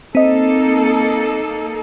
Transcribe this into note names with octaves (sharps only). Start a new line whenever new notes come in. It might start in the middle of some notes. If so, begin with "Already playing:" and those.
A#3 C4 D#4 A4 D#5